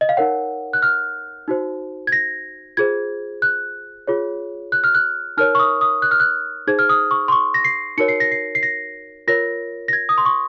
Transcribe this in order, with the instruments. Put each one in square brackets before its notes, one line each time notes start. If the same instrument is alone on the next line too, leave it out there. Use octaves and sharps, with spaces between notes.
[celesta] D#5
F5
D#4 A#4 C#5 F#5
F#6
F6
D#4 F#4 C5
G#6
A#6
F4 G#4 C5 G#6
F#6
F4 G#4 C#5
F#6
F6
F#6
D#4 A#4 C#5 F6
C#6
D#6
D#6
F#6
F6
F#6
D#4 G#4 C5 G#6
F6
D#6
C#6
C6
C#6
A#6
C7
D#4 F#4 A#4 C#5 C#7
C7
A#6
C7
C7
A#6
F4 A#4 C#5 A#6
A#6
G#6
D#6
C6
C#6